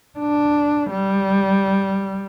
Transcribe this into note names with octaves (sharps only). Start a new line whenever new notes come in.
D4
G3